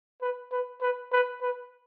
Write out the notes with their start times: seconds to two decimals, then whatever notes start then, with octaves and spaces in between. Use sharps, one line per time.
0.21 B4
0.52 B4
0.81 B4
1.12 B4
1.42 B4